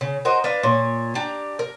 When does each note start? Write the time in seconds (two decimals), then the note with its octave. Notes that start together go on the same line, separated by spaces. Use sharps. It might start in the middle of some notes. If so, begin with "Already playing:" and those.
0.01 C#3
0.25 F#4 A#4 C5 D#5
0.44 D4 B4 F5
0.63 A#2 C#5
1.15 D4 G4 A#5
1.59 A#4